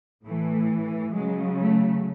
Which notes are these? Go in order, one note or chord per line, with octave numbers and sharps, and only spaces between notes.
A2 E3 A3
C#3 F#3 G#3
A3